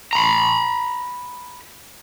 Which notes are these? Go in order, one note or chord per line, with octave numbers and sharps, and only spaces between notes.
A#5 B5